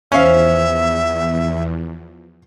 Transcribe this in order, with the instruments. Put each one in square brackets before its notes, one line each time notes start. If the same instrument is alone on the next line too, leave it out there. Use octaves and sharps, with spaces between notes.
[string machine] E2 [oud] F3 [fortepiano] C#4 F5 [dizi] E5